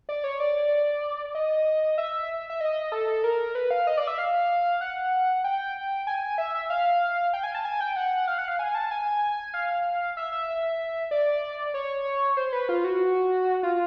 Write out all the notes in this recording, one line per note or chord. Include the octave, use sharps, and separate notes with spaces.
D5
C#5
D5
D#5
E5
E5
D#5
A4
A4
A#4
B4
F5
D#5
D5
E5
F5
F#5
G5
G#5
E5
E5
F5
G5
G#5
A5
G#5
G5
F#5
F5
F#5
F5
G#5
A5
G#5
F5
E5
E5
D5
C#5
C5
B4
F4
F#4
F4